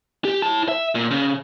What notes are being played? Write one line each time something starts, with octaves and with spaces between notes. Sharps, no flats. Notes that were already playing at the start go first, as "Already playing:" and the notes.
G4
E4 A5
E5
A#2
C#3